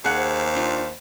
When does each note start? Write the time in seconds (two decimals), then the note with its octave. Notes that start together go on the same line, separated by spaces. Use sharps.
0.04 D#2 G#4 F#5
0.16 C5
0.55 D4 F4